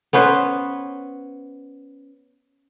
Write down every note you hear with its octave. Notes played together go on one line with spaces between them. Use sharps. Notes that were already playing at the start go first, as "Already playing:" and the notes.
B3 C#4 B4 C5